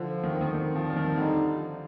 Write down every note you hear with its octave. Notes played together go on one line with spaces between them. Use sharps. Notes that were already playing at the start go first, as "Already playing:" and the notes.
Already playing: D3 F3
D#3 C4
D3
D#3
D#3 C4
F3
F3 G3
D#3
D3 D#4
F3